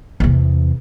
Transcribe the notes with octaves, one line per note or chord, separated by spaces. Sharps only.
E2 C3